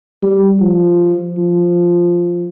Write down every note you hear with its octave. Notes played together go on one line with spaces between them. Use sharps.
G3
F3
F3